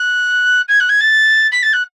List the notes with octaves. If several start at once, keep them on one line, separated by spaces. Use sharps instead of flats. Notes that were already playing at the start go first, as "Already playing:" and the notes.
Already playing: F#6
G#6
F#6
G#6
A6
B6
A6
F#6